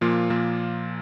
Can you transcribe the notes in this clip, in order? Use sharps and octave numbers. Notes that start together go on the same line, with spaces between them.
A#2 F3 A#3 F4
A#2 F3 A#3 F4